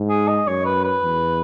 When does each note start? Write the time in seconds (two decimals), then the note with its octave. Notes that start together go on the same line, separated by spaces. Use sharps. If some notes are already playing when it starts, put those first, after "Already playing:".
Already playing: G#2
0.09 G#4
0.28 D#5
0.46 F#2 C#5
0.65 B4
0.84 B4
1.03 E2